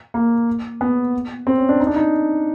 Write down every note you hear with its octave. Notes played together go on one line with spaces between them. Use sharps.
A#3
B3
C4
C#4
D4
D#4
D4
D#4